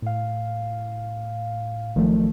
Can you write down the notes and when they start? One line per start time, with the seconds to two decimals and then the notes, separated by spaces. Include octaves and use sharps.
0.02 A2 F5
1.95 A1 D#3 F3 F#3 A3